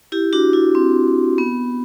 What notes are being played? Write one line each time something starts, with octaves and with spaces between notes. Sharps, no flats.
E4 G4
D4 F#4
E4
C4
B3